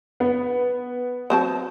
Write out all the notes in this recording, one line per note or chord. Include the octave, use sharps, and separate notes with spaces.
B3
F#3 C4 A5